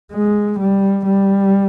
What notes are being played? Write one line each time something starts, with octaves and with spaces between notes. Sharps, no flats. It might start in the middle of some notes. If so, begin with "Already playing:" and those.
G#3
G3
G3